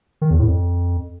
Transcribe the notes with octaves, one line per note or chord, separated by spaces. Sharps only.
D#3
E2
A2
F2